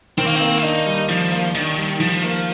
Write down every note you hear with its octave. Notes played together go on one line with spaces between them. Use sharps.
D#3 C4
A#3
C4
A#3
F4
D4 D#4
G3
D#3 F3
A#3
D#3 D4
G3
D#3 F3
A#3